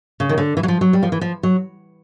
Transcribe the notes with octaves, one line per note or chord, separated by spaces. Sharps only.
C#3
D#3
D3
E3
F#3
F3
F#3
G3
F3
E3
F3
F#3